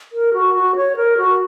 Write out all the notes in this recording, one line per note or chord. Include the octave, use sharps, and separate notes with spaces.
A#4
F#4
F#4
C#5
A#4
F#4